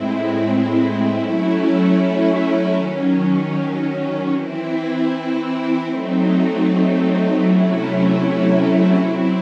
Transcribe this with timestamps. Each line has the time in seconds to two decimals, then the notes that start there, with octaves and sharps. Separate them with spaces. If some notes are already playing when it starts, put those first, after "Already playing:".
Already playing: A2 G#3 C4 E4
1.17 F#3 A3 C#4 E4
2.73 D#3 F#3 C#4
4.29 E3 C4 E4
5.86 F#3 A3 C4 D#4
7.41 C3 F#3 A3 C#4 E4
8.97 F#3 C4 E4